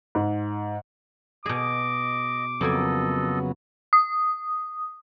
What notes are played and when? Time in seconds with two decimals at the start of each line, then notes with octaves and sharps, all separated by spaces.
0.15 G#2
1.46 B2 G#4 D#5 D6
2.61 F2 C#3 F#3 A#3 B3 A4 D#5 G#5
3.93 D#6